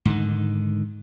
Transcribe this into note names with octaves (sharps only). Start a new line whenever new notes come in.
G#2 D3 D#3